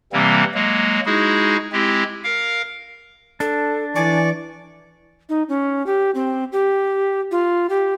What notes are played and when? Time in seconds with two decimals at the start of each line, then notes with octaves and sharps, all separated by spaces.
0.13 C3 E3 G3 A#3 C4
0.54 F#3 G#3 A#3
1.06 G#3 D#4 E4 F#4 G#4
1.72 G#3 C4 E4 G4
2.24 A#4 F5
3.40 D4 A4
3.96 E3 D5 G#5 C#6 D6
5.29 D#4
5.49 C#4
5.86 G4
6.15 C4
6.52 G4
7.31 F4
7.70 G4